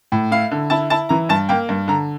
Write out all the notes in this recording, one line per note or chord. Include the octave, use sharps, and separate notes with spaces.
A2
E4 F5
D3
E4 A5
E4 A5
E3 A#5
G2 A5
A#3 G5
G2
D3 A#5